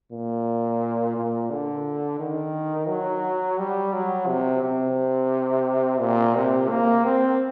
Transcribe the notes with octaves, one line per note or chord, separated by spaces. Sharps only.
A#2
A#2
D3
D#3
F#3
G3
F#3
C3
C3
A#2
C3
A#3
C4